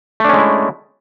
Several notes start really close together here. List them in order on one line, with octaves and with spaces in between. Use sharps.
A3 D4 C#4 G#3 E4